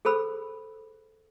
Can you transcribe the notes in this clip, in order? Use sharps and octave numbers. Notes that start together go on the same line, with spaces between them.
G#4 A4 C5 B5 E6